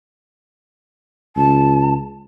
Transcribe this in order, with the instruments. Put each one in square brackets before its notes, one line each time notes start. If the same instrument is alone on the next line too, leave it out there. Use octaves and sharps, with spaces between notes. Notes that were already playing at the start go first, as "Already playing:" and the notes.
[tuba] C#2 [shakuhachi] A5